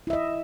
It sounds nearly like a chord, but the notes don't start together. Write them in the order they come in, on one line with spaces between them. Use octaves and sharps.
E4 E5 D#5